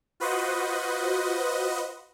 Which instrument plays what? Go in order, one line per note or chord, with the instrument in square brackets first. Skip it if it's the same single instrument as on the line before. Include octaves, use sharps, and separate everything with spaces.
[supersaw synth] F4 F#4 B4 C5 D#5 F#5